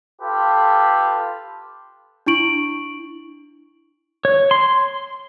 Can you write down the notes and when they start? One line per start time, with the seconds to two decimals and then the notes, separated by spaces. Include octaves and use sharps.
0.22 F4 G4 A4 B4 F5
2.26 D4 E4 C#6 D7 F#7
4.25 C#5
4.51 C6